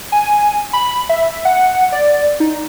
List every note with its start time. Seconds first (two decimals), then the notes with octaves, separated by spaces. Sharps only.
0.12 G#5
0.73 B5
1.09 E5
1.45 F#5
1.92 D5
2.40 D#4